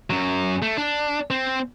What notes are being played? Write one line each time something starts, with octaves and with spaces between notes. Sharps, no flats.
F#2 F#3
A3
D4
C4